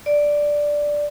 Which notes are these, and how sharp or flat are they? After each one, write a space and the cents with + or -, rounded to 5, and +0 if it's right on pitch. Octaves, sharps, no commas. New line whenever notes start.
D5 +0